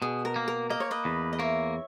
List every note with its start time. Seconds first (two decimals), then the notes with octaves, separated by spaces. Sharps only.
0.02 B2 G#4
0.25 A#4
0.36 A#3
0.48 A#4
0.70 A#3 D#5
0.80 C#5
0.91 B4 D#5
1.05 E2
1.33 D#5
1.39 A#3 C#5 E5